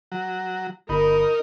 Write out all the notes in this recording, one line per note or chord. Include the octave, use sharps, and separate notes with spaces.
F#3
G1 D#4 A#4 B5